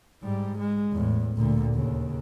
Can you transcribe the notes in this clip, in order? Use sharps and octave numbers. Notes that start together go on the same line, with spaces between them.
G#2 G3
G#3
E2 A2
D2 A#2
D#2 C#3